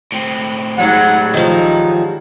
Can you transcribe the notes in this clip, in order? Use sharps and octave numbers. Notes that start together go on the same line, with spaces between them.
A2 C4
G#2 F#3 G3 F#5
D#3 F3 D#4